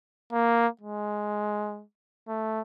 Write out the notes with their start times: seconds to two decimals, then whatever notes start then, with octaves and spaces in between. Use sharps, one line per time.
0.33 A#3
0.81 G#3
2.28 A3